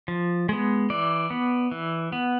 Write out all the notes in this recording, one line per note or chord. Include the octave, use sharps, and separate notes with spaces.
F3
G#3 B3
E3 D5
B3
E3
B3